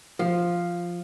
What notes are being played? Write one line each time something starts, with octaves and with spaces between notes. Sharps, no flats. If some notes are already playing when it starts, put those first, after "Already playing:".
F3